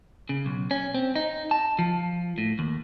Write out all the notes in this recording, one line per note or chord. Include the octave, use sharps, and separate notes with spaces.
C#3
B1
C#4
C4
D#4
A5
F3
A2
D#2